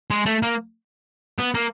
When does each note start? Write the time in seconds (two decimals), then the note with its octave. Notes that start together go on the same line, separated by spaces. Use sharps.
0.10 G#3
0.26 A3
0.43 A#3
1.39 B3
1.55 A#3